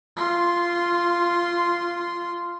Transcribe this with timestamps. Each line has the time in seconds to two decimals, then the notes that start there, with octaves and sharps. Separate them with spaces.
0.16 F4 C6